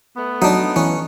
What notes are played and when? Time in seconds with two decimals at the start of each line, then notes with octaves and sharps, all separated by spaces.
0.16 A3 B3
0.42 F#3 D4 D#4
0.76 E3 C#4